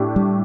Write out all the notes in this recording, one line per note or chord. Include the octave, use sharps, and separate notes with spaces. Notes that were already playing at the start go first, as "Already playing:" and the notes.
Already playing: A2 A3 D4 G4
G3